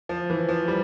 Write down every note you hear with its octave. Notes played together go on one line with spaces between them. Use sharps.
F3
E3
F3
G3